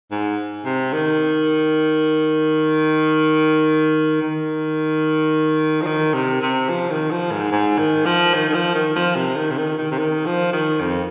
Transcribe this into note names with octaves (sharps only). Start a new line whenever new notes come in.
G#2
C3
D#3
D#3
F3
D#3
C3
C3
F3
D#3
F3
G#2
G#2
D#3
F3
D#3
D#3
F3
D#3
F3
C3
D#3
C3
D#3
D#3
C3
D#3
F3
D#3
F2